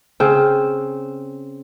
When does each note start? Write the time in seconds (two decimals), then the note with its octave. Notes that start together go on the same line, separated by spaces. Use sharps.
0.20 C#3 C4